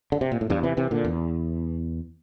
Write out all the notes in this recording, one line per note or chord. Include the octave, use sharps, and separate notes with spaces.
D3
C3
A#2
A2
E2 G2
C3 E3
C3 E3
A#2 D3
E2